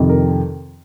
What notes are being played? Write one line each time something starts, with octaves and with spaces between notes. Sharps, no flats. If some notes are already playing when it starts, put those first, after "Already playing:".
Already playing: F2 C3 D#3
A#4